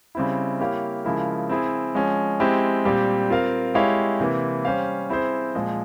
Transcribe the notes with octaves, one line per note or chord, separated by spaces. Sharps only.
C#3 G3 C4 E4
A#3 E4 G4 C#5 F5
C#3 F3 G#3 E4 A#4
C4 E4 G#4
F3 G#3 C#4
G#3 C4 E4 G4
A#2 G3 C4 G4
C4 F4 A#4 F5
G#3 E4 G4 C#5 F5
C3 E3 A#3 E4
G3 C#4 G4 C5 F5
C4 E4 G#4 C5
A#2 F3 G#3